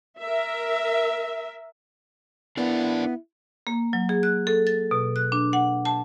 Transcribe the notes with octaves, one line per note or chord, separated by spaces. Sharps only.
A#4 E5
B3 D4 E4 A#4 D5
A#3
F#3
G#4
F#6
A4
A6
B2
F#6
D4
F#5
A5